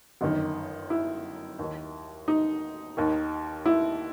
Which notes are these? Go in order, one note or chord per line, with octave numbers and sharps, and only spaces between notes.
G1 F#2 D#3
E4
D#2 D#3
D#4
D#2 D#3
E4